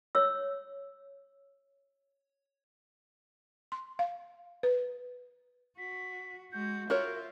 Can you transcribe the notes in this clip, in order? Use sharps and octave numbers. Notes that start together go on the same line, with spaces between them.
C#5 E6
C6
F5
B4
F#4 B6
G#3 F#4 G6
F4 F#4 A#4 C#5 E5